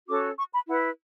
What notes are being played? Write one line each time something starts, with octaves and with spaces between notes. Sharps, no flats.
C#4 F#4 A4 D6
C#6
B5
E4 B4 F#5